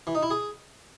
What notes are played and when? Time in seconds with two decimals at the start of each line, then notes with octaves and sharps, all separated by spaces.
0.07 E3
0.15 D#4
0.23 E4
0.30 G#4